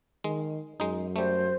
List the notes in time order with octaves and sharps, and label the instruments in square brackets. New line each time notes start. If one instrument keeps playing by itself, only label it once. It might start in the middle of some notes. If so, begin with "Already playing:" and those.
[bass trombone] D#3 [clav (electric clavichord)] G#3
[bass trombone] F#2 [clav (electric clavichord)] G#3 D#4
[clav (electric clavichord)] G3 A3 [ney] C5